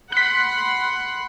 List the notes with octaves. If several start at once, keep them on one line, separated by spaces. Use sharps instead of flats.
F#5 B5 C6 F#6 B6